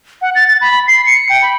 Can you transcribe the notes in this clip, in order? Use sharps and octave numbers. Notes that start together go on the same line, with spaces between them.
F#5
A6
A6
B5
C7
C#7
G5
B5